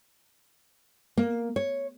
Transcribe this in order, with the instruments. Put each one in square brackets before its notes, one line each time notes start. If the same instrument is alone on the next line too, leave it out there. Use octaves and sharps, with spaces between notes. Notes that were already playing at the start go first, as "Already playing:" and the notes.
[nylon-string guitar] A#3
C#5